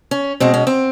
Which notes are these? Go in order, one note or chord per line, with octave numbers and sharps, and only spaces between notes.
C#4
B2 G#3 C4
C#4
C4